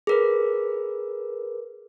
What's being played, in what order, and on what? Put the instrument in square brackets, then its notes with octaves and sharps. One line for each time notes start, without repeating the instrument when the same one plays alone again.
[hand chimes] G#4 A#4 B4